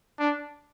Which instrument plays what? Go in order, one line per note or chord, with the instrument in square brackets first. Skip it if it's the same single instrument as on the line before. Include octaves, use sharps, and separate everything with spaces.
[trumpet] D4